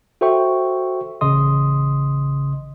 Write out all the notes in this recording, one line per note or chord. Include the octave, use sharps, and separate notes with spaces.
F#4 A4 C5 E5 G5 C#6
A1 C#3 D#5 C6 D#6